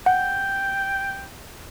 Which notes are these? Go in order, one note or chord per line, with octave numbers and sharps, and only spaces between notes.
F#5 G5